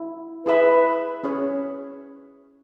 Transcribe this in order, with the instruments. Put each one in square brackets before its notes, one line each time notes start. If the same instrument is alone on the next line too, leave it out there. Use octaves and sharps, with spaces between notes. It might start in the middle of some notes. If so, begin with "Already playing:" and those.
Already playing: [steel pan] E4
[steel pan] E4 G#4 E5 B5 [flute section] B4
[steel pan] C#4 G#4 C#5